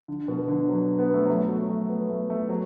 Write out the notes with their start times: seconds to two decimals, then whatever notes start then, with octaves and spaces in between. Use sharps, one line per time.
0.08 D3
0.28 B2
0.48 D3
0.69 F#3
0.99 B3
1.14 A3
1.25 F#3
1.29 A3
1.49 F#3
1.69 A3
1.89 B3
2.10 A3
2.30 A3
2.49 F#3